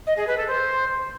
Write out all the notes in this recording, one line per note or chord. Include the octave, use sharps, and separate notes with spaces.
D#5
G#4
B4
A4
C5